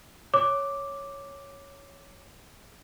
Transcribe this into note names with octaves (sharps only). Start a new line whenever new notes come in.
C#5 D6